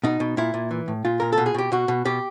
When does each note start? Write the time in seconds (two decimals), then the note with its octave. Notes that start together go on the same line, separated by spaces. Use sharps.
0.04 B2 D#4
0.20 B2
0.37 A#2 E4
0.54 A#2
0.71 E3
0.88 A2
1.05 A#2 F4
1.20 A#2 A#4
1.32 A4
1.38 B2
1.46 G#4
1.55 B2 G4
1.72 B2 F#4
1.88 B2
2.05 B2 G4